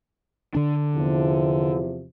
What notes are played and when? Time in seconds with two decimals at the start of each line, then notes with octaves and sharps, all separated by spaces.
0.55 D3 D4
0.95 E2 C3 F3